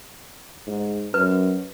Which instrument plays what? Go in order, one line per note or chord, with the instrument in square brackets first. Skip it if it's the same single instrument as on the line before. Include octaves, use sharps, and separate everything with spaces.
[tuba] G#2
[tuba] F#2 [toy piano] B4